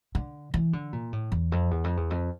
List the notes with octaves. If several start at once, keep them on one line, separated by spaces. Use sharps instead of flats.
D3
E3
D3
A#2
A2
E2
F2
E2
F2
E2
F2